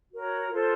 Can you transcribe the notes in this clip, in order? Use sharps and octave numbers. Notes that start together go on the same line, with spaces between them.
F#4 A#4 C#5
F4 A4 C5